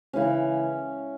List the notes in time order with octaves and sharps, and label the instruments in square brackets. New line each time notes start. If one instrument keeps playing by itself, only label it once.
[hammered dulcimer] C#3 E3 G#3 C#4